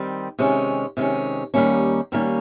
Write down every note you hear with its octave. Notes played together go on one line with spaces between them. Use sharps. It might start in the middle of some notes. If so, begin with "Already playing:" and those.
Already playing: D#3 G3 C4
C3 D#3 G#3 C#4
C3 D#3 G#3 C#4
D#2 D#3 G3 A#3 C#4
D#2 D#3 G3 A#3 C#4